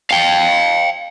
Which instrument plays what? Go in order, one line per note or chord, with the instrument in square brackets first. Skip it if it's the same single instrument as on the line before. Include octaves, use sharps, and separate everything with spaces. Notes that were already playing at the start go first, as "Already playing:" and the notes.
[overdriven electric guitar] F5 G5